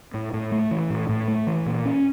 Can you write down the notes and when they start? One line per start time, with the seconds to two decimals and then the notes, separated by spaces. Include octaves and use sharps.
0.14 A2
0.33 A2
0.52 A3
0.71 E3
0.90 A2
1.09 A2
1.28 A3
1.47 E3
1.66 A#2
1.85 C#4